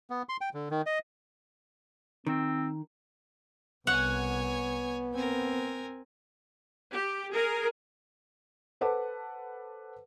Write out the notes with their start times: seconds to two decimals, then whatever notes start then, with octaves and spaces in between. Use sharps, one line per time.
0.10 B3
0.29 C6
0.41 G5
0.54 D3
0.71 D#3
0.86 D#5
2.27 D#3 C4
3.87 C2 B3 C#5 F#5 G#5
5.14 C4 A#4 G#5
6.91 G4
7.33 G#4 A#4
8.81 A4 B4 C5 F#5 A5 D6